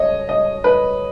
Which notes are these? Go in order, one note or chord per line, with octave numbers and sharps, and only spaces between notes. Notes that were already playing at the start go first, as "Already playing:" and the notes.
Already playing: C#5 D#5
D#5
B4